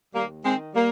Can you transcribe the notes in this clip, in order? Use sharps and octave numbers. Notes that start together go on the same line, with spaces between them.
D#2 G3 A#3
D#3 G#3 C4
G3 A#3